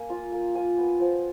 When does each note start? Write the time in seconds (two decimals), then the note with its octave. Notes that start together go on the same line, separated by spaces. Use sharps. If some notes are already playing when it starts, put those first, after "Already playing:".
Already playing: A#3 G#5
0.09 F4 A#5
0.32 A#3
0.55 F4 G#5
0.78 B3
1.00 F3